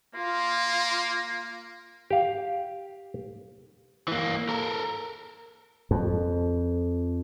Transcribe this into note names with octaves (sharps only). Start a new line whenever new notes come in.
A#3 F4
G4 F5
E3 A#3
A4 A#4
F2